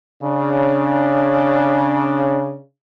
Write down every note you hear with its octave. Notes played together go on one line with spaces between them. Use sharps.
C#3 D4